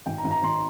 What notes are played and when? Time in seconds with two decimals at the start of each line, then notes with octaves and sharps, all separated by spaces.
0.06 G#1 G5
0.18 A#5
0.24 G#1
0.31 A#5
0.43 G#1 C6